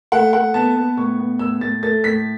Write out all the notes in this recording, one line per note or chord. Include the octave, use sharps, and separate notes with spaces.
A3 F#5
A3 F#5
B3 A5
B3
A2 C#6
B3
A2 E6
A2 A6
A3 A6
A2 B6